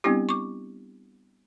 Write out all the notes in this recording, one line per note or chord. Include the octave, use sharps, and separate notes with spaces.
G3 B3 C4 D4 E4 G4
C#6 D6